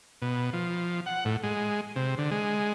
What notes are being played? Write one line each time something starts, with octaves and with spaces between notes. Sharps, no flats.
B2
F3
F#5
A2
G#3
C3
D3
G#3